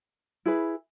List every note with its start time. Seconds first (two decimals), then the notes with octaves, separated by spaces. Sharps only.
0.46 E4 G#4 B4